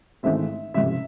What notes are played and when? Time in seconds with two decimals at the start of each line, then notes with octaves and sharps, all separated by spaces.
0.23 G#1 G#2 E3 A3 C4 E5
0.74 F#1 F2 C3 E5